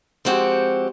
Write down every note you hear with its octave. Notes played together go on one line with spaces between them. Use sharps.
F3 G#3 C4 F#4 G4